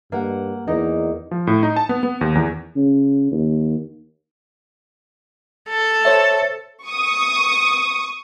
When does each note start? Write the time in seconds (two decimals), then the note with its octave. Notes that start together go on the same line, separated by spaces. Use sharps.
0.12 G2 A#3 F#5
0.67 E2 A#3 D#4
1.31 F3
1.47 A2
1.63 D#4
1.76 A5
1.89 B3
2.03 B3
2.21 D#2
2.35 E2
2.76 C#3
3.31 D#2
5.68 A4
6.05 C5 C#5 E5
6.85 C#6 D#6